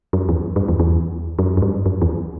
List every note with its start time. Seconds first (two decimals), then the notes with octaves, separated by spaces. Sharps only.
0.13 F#2
0.29 E2
0.56 G2
0.68 E2
0.80 E2
1.39 F#2
1.57 F#2
1.62 G2
1.86 F#2
2.02 E2